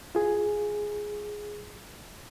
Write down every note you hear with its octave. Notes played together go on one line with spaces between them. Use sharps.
F4 G#4